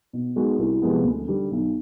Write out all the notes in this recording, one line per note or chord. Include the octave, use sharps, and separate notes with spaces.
B2
G#3 B3 D#4 F#4
C2
C3 F3 G#3 B3
D2
D3 G3
B1